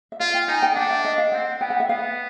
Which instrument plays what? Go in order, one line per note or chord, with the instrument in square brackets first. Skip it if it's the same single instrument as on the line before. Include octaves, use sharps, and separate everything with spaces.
[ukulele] E5
[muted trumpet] F4 [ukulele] F5
[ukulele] G5
[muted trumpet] D#4 [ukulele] G#5
[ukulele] G5
[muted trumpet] D4 [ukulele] F#5
[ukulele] E5
D#5
F5
[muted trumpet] C4 [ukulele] F#5
[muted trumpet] B3 [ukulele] G5
[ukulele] F#5
E5
[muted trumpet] B3 [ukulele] F5